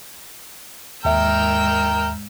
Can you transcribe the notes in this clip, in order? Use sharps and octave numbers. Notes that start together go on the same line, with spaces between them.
D#2 G#2 E5 G5 A#5 E6 F6 G6